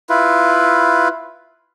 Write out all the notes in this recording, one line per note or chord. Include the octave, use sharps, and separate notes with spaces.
E4 F4 B4